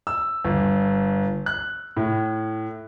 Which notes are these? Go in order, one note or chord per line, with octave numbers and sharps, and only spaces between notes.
E6
G1
F#6
A2